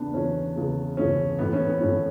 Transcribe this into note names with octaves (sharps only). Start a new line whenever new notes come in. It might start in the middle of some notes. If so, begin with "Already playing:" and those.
Already playing: E2 C#3 E3 B3 D4
E2 C#3 E3 C#4
E2 C#3 E3
E2 C#3 E3 C#4
A2 E3 B3
C#4
B3
A2 E3 C#4